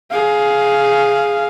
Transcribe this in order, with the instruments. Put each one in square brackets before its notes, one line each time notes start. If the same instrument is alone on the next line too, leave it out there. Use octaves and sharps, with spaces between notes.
[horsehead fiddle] G#4 F5